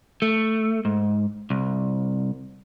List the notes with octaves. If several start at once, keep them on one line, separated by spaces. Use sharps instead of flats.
A3
G#2
C2